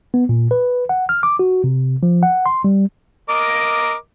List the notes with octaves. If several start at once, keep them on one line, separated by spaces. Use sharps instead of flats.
B3
A#2
B4
F#5
F6
D6
F#4
C3
F3
F#5
C6
G3
A#4 D#5 D6